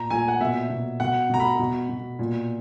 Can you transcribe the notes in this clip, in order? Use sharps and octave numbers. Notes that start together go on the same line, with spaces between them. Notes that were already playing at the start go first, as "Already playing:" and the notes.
Already playing: A#2 A#5
A#2 G#5
F#5
B2 E5
B2
B2 F#5
B2 A#5
B5
B2
B2
A#2